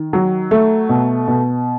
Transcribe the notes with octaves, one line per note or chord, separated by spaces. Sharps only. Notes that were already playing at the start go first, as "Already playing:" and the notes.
Already playing: D#3
F#3
A3
B2
B2